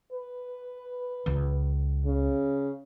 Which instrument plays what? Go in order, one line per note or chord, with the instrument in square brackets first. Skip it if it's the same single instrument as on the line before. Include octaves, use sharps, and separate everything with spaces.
[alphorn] B4
[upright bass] C#2
[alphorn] C#3